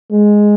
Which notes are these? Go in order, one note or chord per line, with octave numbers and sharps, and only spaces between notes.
G#3